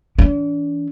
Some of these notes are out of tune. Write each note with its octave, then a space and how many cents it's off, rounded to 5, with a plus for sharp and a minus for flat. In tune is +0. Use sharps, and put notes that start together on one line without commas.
E3 +0 D4 -40